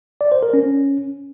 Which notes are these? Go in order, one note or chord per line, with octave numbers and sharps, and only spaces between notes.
D5
C5
A#4
C#4